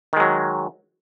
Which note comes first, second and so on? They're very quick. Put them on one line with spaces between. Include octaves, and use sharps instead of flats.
D#3 G#3 F#3